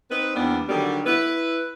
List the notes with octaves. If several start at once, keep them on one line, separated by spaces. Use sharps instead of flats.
C4 D#4 B4
E2 G3 A#3 B3 D4
D3 D#3 F#3 G3
E4 B4